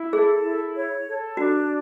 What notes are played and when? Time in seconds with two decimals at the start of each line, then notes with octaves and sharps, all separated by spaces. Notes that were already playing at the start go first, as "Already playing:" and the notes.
Already playing: E4
0.13 G#4 A4
0.44 E4
0.75 C#5
1.06 A4
1.37 D4 F#4